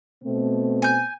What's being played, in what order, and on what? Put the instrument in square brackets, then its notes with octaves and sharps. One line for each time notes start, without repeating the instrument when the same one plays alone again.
[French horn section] B2 A3 C4
[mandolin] G#5 G6